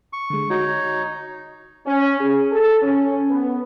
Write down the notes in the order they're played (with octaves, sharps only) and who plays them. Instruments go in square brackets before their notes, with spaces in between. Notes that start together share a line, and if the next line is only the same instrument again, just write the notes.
[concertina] C#6
[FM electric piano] D3 G#3
[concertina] D#4 C#5 [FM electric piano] F#4
[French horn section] C#4
G#4
A4
C#4
B3